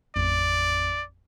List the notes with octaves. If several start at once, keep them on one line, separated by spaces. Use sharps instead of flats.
A1 F2 D5